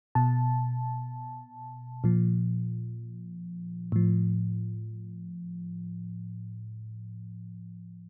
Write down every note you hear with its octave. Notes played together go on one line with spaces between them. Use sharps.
B2 A5
A#2 F3
A2 F3